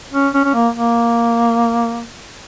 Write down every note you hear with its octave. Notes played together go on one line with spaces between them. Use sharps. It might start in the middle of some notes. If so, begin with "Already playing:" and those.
C#4
C#4
C#4
A#3
A#3